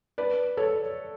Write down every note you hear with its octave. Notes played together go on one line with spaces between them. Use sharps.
B4 D5
A4 C#5